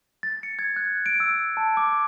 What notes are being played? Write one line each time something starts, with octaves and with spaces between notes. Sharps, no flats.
A6
C#7
G#6
F#6
D7
E6
A5
D6